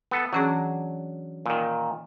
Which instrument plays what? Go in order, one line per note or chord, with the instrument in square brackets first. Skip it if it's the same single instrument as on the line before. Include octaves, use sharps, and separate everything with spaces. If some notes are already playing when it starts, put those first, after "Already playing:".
[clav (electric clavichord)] B3 A4
[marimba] E3 C#4 G#4 [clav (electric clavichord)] F#3 D4
[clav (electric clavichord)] A#2 D#3